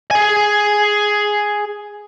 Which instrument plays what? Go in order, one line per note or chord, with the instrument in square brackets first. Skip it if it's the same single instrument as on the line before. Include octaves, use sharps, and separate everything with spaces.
[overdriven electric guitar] G#4 G#5